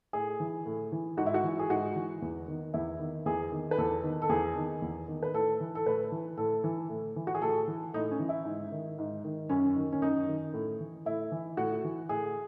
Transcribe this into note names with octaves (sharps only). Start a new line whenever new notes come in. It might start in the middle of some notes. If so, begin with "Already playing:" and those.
A2 G#4
E3
A2
E3
G#2 F#4
E4
F#4
E3
G#4
G#2 F#4
E3
E2
D#3
E2 E4
D#3
E2 G#4
D#3
B4
E2 A4
D#3
A4
E2 G#4
D#3
E2
D#3
B4
A2 A4
E3
A4
A2 B4
E3
A2 A4
E3
A2
E3
F#4
G#4
A2 A4
E3
A2 D#4
C#4
E3
E4
G#2
D#3
G#2
D#3
F#2 C#4
D#3
C#4
F#2 D#4
D#3
A2
E3
A2 E4
E3
A2 F#4
E3
A2 G#4